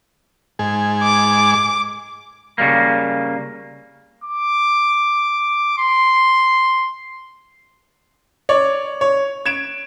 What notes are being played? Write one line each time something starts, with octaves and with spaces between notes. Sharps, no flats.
G#2 G#4
D6
C#3 G3 A#3
D6
C6
C#5 D5
C#5
G#6 D7 E7